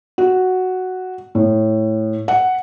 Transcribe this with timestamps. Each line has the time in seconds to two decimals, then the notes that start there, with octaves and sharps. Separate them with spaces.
0.18 F#4
1.35 A2
2.28 F#5